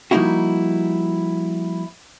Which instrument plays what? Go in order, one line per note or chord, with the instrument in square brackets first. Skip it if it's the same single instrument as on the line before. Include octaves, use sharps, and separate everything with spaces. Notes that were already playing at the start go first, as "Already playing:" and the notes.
[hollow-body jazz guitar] F3 G3 A#3 D#4 E4 F#4